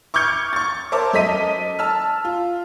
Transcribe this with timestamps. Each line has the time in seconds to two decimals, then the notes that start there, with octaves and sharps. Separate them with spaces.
0.14 C#6 D6 F6 G6 G#6 C#7
0.53 C#6 A6
0.92 A#4 C5 C#5 E5 A5 D6
1.13 F#2 A4 D#5 B6 D#7
1.79 A5 E6 F6
2.25 F4